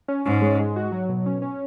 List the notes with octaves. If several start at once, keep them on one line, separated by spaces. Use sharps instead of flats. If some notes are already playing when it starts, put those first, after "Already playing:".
C#4
G#2 C#4
G#3
G#3
F#4
F#3
B2
C#4
C#4